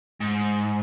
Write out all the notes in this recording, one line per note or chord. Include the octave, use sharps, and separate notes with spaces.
G#2